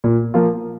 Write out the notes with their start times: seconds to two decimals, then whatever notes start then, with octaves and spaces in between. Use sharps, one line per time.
0.04 A#2
0.34 F3 A#3 F4